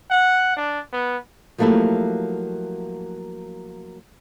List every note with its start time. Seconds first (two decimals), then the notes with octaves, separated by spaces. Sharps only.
0.10 F#5
0.57 D4
0.92 B3
1.58 F3 F#3 A3 A#3 E4 G4